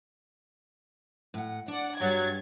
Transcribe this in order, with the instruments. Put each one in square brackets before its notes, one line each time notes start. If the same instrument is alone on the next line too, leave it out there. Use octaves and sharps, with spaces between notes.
[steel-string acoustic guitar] A2 F#5
[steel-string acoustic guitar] D4 [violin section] D5 F#5
[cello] G2 [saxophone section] F#3 [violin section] G#6 A6